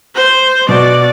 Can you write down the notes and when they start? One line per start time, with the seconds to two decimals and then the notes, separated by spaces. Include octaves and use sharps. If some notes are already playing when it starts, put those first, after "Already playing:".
0.15 C5
0.69 B2 F#4 D5